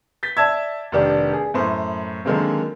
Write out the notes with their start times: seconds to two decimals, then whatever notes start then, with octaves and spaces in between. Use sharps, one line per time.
0.23 G6 A6 B6
0.37 D5 E5 A5 E6 G#6
0.92 F1 D#3 D4 G4 D5
1.33 G#4
1.54 F#2 A2 C5 C6
2.25 D3 D#3 F#3 G#3 A#3 C4